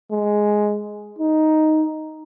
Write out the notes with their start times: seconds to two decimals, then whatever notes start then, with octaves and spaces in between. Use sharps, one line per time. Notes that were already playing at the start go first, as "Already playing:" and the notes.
0.12 G#3
1.18 D#4